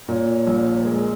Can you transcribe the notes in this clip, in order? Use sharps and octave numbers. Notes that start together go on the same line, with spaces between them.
A#2 C#5
A#1
G#3 A#4